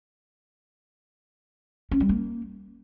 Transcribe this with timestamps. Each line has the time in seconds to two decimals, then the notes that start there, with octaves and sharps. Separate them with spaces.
1.91 C#4
2.00 G3
2.09 A#3